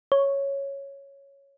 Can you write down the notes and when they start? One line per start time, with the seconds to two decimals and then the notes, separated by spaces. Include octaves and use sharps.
0.12 C#5